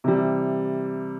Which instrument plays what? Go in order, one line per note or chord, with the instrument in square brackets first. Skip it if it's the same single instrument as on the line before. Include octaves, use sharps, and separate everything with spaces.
[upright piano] C3 E3 G3